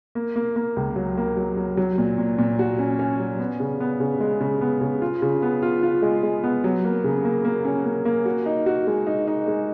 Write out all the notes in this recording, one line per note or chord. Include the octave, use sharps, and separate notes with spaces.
A#3
A#3
A#3
C#2
F#3
A#3
F#3
F#3
F#3
A#2
A#2
A#2
F#4
C#4
C#4
F#3
B3
C#3
B3
C#3
G#3
C#3
B3
C#3
F4
C#3
B3
F4
F4
G#3
G#3
B3
F#3
A#3
C#3
A#3
A#3
C#4
A#3
A#3
F#4
D#4
F#4
G#3
D#4
D#4
G#3